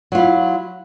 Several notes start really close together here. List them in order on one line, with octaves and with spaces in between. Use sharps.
F#3 F4 E4